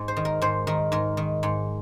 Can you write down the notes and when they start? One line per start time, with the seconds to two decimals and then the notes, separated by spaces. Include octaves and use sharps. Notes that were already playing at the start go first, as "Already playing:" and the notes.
Already playing: G#2
0.08 C5
0.17 D#3
0.25 A#4
0.42 G#2 C5
0.67 D#3 A#4
0.92 G#2 A#4
1.17 D#3
1.43 G#2